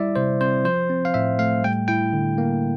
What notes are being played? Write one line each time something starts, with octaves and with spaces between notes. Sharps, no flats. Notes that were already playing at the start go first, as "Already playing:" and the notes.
Already playing: G3 E4 D5 E5
C3 C5
C4 C5
F3 C5
C4
F5
A2 E5
A3 F5
G3 G5
E4 G5
D3
A#3